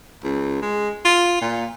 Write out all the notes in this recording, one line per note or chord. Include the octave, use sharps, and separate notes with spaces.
C#2
G#3
F4
A#2